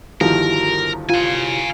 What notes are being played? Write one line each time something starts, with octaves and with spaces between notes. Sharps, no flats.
G1 D#3 F3 E4 F#4 G4 A#4
F4 F5 G#5